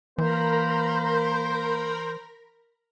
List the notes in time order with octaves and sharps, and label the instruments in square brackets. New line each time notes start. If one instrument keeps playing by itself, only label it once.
[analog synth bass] E3 [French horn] A#3 [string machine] A#4 A#5 B5 [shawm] C5